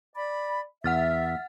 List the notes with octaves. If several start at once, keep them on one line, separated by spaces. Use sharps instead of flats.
D5 B5
E2 E5 F#5 F6 A6